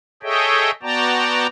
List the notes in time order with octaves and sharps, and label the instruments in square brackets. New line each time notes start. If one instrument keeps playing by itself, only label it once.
[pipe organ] G#4 A4 C#5 D#5 E5 G5
B3 F#4 D5 G5 A5 A#5